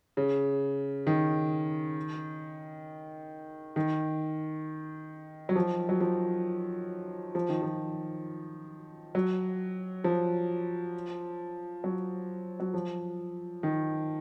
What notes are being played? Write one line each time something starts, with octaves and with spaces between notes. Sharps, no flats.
C#3
D#3
D#3
F#3
F3
F#3
F3
F3
D#3
F3
F#3
F3
F#3
F#3
F3
D#3